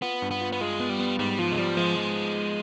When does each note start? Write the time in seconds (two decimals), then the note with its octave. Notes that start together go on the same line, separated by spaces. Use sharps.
0.02 B3 F4
0.22 G2
0.31 B3
0.41 F4
0.52 B3
0.60 G#3 F4
0.80 B3
0.89 G3
1.00 B3
1.19 G#2 G3
1.39 F3 F4
1.52 G#3
1.58 F3 G3
1.77 F3 G#3
1.97 F3